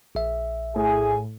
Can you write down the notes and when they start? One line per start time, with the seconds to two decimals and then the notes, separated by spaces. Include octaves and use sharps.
0.15 A#1 E5
0.76 A2 G#4 G#5